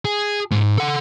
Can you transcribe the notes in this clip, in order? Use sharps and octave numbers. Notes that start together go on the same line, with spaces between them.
G#4
G#2
A4 F#5